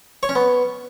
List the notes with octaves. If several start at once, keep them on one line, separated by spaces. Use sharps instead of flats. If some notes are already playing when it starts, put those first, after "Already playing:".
C#5
C#4
B3